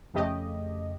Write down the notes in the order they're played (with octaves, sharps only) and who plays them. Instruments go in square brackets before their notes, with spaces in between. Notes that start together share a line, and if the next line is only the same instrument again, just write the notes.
[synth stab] F2 C#3 A3 G4 D#5